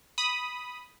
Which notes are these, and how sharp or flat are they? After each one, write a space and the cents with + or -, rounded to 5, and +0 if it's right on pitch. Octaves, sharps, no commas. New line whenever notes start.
B5 -5 D#6 +0